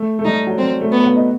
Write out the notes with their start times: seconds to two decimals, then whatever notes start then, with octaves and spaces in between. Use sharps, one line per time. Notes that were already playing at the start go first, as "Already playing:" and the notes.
Already playing: A3
0.19 A3
0.25 G3 D#4
0.47 F#3
0.58 G3 C4
0.81 A3
0.92 B3
1.04 B3
1.16 D#4